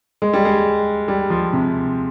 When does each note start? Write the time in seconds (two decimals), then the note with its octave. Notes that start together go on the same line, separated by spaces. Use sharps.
0.22 G#3
0.33 G3
0.45 G#3
1.08 G3
1.30 F3
1.53 C3